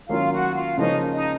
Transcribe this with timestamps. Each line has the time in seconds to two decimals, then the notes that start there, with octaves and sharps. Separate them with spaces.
0.08 D#3 F#3 A#3 C#4 F4 F5
0.32 F#4 F#5
0.55 F4 F5
0.77 C#3 F3 A#3 C#4 D#4 D#5
1.13 D#4 D#5